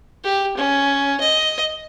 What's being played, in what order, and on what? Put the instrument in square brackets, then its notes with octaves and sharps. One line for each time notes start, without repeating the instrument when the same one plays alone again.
[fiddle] G4
C#4
D#5